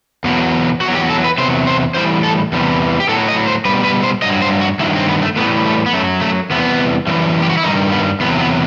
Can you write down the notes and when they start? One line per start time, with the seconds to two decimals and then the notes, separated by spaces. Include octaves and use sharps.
0.24 E2 B2 F#3
0.81 E2 D#3 F#3 F#4
0.95 G4
1.10 A4
1.24 B4
1.38 E2 C3 F#3 C5
1.67 C5
1.94 A2 E3 G3 C5
2.23 A4
2.52 E2 C3 E3 G3
3.00 G4
3.09 A2 F#3 A4
3.28 D#5
3.47 C5
3.65 G3 B4
3.68 B2
3.84 B4
4.04 C5
4.22 G2 F#3 D#5
4.42 C5
4.61 F#4
4.80 G2 D#3 F#3 E4
4.96 C4
5.09 B3
5.22 A3
5.36 A2 E3 G3 B3
5.65 A3
5.86 B3
5.93 F#2 F#3 A3
6.21 A3
6.50 E2 C3 E3 G3 B3
7.07 F#2 E3 G3
7.42 G4
7.50 F#4
7.57 E4
7.64 G2 D#3 G3 D#4
7.92 B3
8.20 E2 C3 F#3 B3
8.40 B3